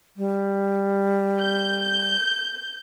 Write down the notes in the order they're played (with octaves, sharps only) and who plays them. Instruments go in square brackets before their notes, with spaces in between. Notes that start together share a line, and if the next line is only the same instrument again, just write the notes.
[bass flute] G3
[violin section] G6